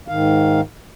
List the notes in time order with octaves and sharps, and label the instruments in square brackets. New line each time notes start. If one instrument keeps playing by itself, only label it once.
[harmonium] G#2 D#3 F5